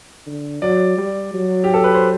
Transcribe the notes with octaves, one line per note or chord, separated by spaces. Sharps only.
D3
F#3 D5
G3
F#3
G4
A4
B4
C5